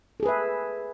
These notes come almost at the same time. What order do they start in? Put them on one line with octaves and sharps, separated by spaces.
A4 G#4 B4 E5